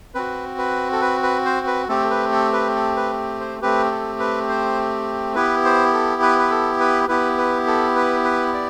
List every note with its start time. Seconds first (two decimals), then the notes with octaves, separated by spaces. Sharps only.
0.15 C4 F#4 B4
0.58 B4
0.92 A4
1.01 B4
1.23 B4
1.45 C5
1.67 B4
1.89 A3 C4 G4 A4
2.10 B4
2.32 A4
2.53 B4
2.75 A4
2.96 B4
3.40 C5
3.62 A3 C4 G4 B4
3.91 A4
4.19 B4
4.49 C5
5.35 B3 E4 G4 B4
5.65 C5
5.93 A4
6.22 B4
6.39 B4
6.51 A4
6.80 B4
7.08 B3 E4 G4 B4
7.38 B4
7.67 A4
7.96 B4
8.24 B4
8.54 D5